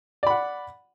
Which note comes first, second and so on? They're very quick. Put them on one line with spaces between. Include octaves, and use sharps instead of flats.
D5 B5 F#5